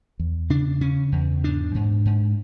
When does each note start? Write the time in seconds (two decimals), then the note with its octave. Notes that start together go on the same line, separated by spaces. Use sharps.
0.19 E2
0.50 C#3 D4
0.81 C#3 C#4
1.12 E2
1.44 G#2 D4
1.75 G#2
2.05 G#2